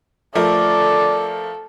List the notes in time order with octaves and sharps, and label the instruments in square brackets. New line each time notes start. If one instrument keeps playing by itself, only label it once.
[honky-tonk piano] F3 A3 A#4 [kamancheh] A4 [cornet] D5